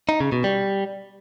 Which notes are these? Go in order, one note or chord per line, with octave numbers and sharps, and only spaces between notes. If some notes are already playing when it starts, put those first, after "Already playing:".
D#4
C#3
B2
G3